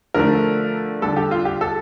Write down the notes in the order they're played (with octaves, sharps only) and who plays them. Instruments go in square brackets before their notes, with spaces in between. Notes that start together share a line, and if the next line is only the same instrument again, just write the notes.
[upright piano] D3 F3 A3 A#4
D3 G3 A4
G4
F4
G4
A4